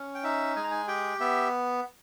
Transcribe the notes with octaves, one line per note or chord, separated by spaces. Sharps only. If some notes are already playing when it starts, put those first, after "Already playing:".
Already playing: C#4
G5
D#4 E5
G#3 G#5
A#5
G#5
G4 G5
B3 E5